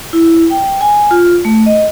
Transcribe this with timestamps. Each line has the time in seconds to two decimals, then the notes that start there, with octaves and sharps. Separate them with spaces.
0.13 E4
0.50 G5
0.81 G#5
1.11 F4
1.45 A3
1.66 D#5